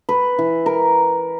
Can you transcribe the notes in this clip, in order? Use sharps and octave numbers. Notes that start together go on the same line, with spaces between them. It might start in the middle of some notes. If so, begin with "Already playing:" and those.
B4
E3
A#4